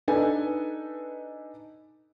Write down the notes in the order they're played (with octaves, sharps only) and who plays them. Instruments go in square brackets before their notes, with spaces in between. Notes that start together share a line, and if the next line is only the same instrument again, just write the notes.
[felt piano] D4 D#4 A4 B4 D#5 G#5